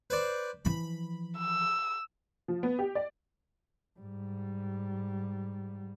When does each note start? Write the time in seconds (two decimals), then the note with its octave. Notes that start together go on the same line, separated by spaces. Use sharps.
0.10 B4 C5 D5
0.65 E3 F3 B5
1.37 E6
2.48 F3
2.63 B3
2.79 G4
2.95 D5
3.99 G#2 G3